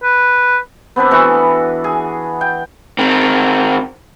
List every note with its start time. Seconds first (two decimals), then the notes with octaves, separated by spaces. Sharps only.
0.03 B4
0.96 B3 C4 D4 B4
1.11 E3 B3 F#4 A4
1.84 G#4
2.41 G5
2.99 D#3 C4